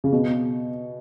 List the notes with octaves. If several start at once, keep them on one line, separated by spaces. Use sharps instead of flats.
C#3
B2